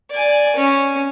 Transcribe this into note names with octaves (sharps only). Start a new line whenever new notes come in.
D5 G#5
C#4